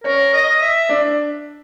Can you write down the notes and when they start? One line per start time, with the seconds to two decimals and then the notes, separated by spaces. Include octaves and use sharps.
0.04 C#4 A#4 C#5
0.33 D#5
0.61 E5
0.89 D4 D5